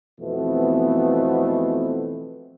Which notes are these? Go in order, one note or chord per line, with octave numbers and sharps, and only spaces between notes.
F2 B2 E3 A3 B3 C4